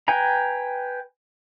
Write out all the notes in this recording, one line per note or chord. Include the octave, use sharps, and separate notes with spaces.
B4 G5 G#5 A#5